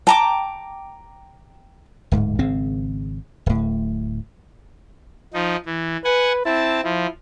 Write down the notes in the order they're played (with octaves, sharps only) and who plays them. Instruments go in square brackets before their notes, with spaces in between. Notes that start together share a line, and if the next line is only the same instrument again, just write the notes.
[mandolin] G5 A#5 D6 [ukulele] A5
[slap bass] D1 G#2
G#1 C#3 C4
D1 A2
[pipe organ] F3 D#4
E3
[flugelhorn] B4 [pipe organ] F#5 G#5
[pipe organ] C4 A5 [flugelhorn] E4
[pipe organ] F3 [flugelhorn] E4